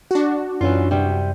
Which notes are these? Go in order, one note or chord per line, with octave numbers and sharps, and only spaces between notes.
D4 F#4
F#2 E3 C#4 F4
C3 G3